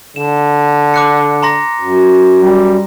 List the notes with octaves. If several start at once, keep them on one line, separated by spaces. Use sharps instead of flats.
D3 E7
D6 F#6 C#7
A#5 C6 A#6
F#2
G3